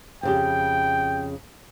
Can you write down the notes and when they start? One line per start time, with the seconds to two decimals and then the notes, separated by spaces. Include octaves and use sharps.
0.23 F2 C#3 G4 G5